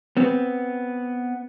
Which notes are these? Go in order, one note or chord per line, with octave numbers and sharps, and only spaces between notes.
B3 C4